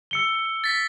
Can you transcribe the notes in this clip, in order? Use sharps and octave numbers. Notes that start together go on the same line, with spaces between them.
E6 C#7 G7
A6 B6